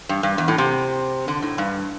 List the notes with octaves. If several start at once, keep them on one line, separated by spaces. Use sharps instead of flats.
G2
G2
E2
A2
C3
D3
A2
G2